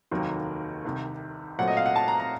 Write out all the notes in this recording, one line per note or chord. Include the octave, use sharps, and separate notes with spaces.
F1 D#2 D#3 F#3 A#3
C2 C3 D#3
A#2 F#3 A3 C4 F#5
D#5
F5
F#5
A5
A#5
A#5